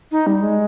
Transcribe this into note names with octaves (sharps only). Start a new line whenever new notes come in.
D#4
G3
G#3